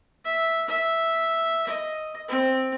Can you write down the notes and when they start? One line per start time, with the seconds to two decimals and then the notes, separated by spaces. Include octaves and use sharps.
0.25 E5
0.68 E5
1.67 D#5
2.28 C4